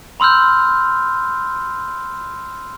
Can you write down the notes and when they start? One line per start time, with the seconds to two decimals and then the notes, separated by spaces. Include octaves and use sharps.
0.20 B5 C6 E6 F6 G6